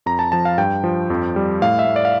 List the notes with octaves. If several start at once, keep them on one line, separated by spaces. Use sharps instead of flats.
F2 A#5
A5
F3 A5
F5
G2 G5
F3
F2
G3
A2 F5
E5
A2
D5
F5